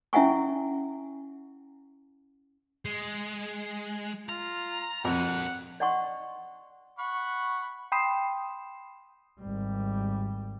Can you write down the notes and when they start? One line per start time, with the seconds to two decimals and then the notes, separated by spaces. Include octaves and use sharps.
0.13 C#4 E4 E5 F#5 G#5 C#6
2.85 G#3
4.29 F4 A#5
5.05 F2 A#4 C#5 F#5
5.80 D5 D#5 F#5 C6 C#6
6.99 F#5 B5 C#6
7.92 G5 B5 C6 D#6 C7 E7
9.40 G#1 G3